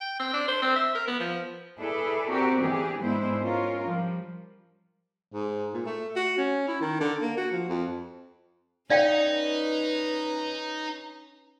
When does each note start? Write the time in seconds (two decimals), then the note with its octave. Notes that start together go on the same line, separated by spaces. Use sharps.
0.01 G5
0.20 C4
0.33 D4
0.48 C5
0.62 C4
0.76 E5
0.95 A#4
1.08 B3
1.20 F3
1.79 E4 G#4 A4 B4 D5
2.29 C4 F#4 G4 A#4 D5
2.62 E3 D4 G4 G#4
3.01 G#2 G#3 B3 D4 E4 C5
3.41 C#4 F4 A#4
3.86 F3 G3
5.34 G#2
5.74 A#2
5.86 A3
6.16 F#4
6.37 C#4
6.68 E4
6.81 D#3
7.01 D3
7.22 A#3
7.37 F#4
7.52 F3
7.69 F2
8.90 C#4 D#4 B4 D5 F5 G5